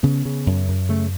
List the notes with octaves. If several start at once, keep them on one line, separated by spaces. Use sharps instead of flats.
C#3 B3
C#3
F#2
F#2
C#3 A3